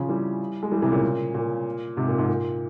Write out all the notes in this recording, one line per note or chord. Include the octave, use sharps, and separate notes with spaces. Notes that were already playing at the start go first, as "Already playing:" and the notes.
Already playing: C#3 F3
E3 G3
G#3
E3 G3
C3 E3
A#2 C#3
A#2
G#2 C3
A#2
G#2
A#2